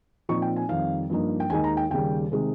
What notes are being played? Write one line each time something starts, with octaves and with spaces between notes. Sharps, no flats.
A#2 F3 C4 D#4 C#6
G5
G#5
F2 D#3 G3 F5
G2 F3 A#3 D#4
G5
D#2 D#3 G#3 D#4 G#5
A#5
G5
D#2 C#3 G3 G5
C3 D#3 G#3